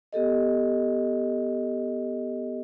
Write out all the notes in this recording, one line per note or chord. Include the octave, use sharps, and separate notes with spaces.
B3 G4 A4 D#5